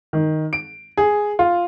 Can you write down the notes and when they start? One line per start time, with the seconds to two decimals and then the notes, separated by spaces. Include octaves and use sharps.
0.13 D#3
0.53 D7
0.97 G#4
1.39 F4